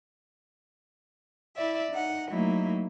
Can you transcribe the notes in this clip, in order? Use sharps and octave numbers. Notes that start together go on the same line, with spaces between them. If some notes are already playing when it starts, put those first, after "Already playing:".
E4 D5 E5
D#4 F#5
F#3 A3 A#3 D#4 E4